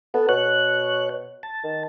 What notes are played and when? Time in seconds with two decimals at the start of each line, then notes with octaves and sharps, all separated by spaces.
0.14 B3 A4
0.29 B2 C#5 F#6
1.43 A5
1.64 D#3